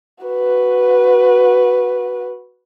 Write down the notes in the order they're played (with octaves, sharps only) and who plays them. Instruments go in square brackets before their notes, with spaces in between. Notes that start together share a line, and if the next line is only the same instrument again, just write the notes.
[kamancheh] F#4 B4